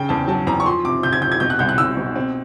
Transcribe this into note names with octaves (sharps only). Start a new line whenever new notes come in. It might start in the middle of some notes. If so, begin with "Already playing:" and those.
Already playing: C#3 G5
E2 A5
F#3 A5
E2 A#5
C#6
F3 C6
C3 D6
C3 G6
G#6
C3 G6
G#6
B2 G6
F#6
C2 G6
F#6
C2 E6
B2
C4